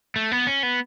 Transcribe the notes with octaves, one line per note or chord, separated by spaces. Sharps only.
A3
B3
C#4
B3